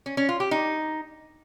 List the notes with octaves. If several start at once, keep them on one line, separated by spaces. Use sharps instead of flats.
C#4
C#4
F4
G4
D#4